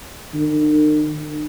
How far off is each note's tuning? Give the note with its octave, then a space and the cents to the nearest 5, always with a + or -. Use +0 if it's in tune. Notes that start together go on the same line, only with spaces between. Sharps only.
D#3 -45